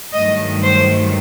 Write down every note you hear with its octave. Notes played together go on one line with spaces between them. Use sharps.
G2 D#3 F#3 A3 D#5
C5